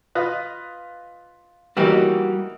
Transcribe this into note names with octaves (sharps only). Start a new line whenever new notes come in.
F4 B4 D#5
E3 G3 A#3 D#4 F#4 G4